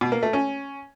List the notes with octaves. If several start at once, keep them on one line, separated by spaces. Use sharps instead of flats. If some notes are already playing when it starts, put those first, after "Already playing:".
B2
A#3
A3
C#4